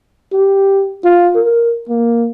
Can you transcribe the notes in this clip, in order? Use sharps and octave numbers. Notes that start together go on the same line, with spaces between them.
G4
F4
A#4
A#3